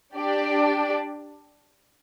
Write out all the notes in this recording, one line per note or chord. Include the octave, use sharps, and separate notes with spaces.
D4 G4 D5